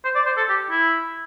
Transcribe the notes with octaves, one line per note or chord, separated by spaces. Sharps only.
C5
D5
C5
A4
G4
E4